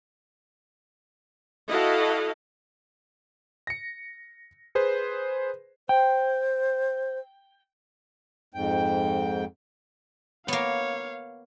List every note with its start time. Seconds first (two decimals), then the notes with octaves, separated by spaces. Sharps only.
1.70 E4 F#4 A4 D#5 F5
3.67 A#6 C#7
4.75 G#4 B4 C5
5.89 C5 G5
8.54 F2 G#2 G5
10.48 A#3 B3 C#5 F5